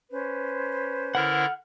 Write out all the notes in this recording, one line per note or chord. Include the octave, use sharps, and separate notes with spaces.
C#4 B4 C5
D3 E4 A#4 F#5 F6